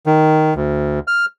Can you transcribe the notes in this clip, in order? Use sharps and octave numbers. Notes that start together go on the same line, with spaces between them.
D#3
D2
F6